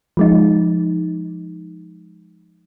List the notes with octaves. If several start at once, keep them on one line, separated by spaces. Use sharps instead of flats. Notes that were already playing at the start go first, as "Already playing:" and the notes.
F3 G#3 D#4